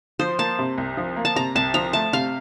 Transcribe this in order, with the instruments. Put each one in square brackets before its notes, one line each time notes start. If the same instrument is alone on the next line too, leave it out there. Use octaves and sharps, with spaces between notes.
[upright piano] F3 [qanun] C5
[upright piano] A#3 [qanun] A5
[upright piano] C3
C2
F3
A#3
[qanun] A5
[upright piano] C3 [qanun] A#5
[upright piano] C2 [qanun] A5
[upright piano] F3 [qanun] A#5
[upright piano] A3 [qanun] A5
[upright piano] C3 [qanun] F5